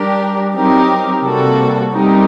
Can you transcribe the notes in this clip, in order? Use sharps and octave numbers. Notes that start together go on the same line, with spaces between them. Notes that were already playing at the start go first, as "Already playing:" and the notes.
Already playing: G3 D4 G4 A#4
F#3 C4 D#4 G4 A#4
C3 G3 A#3 F#4 A4
G3 C4 D#4 G4 A#4